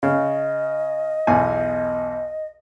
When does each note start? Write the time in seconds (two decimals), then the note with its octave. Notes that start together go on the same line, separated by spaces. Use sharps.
0.03 C#3 D#5
1.27 B1 E2 G#5